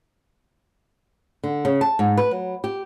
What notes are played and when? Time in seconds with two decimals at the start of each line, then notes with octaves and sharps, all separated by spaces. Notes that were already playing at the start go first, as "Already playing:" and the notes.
1.44 D3
1.65 C#3
1.81 A5
1.99 G#2
2.17 B4
2.31 F#3
2.64 G4